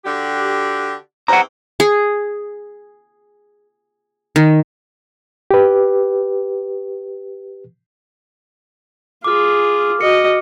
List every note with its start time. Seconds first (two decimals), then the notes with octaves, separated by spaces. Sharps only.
0.05 D3 F#4 G4
1.28 E2 C4 F#5 A#5
1.80 G#4
4.36 D#3
5.51 G4 B4
9.24 F4 G#4 D6 F6
10.01 F#4 D#5 C#7